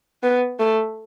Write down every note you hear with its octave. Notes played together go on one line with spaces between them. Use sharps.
B3
A3